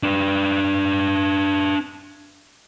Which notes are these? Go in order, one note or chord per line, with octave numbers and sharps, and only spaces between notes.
D4 B4